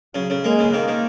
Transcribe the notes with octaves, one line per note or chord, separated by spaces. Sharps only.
C#3 F#3
C#3
G#3 A#3
C#3
D#3 A#3
D#3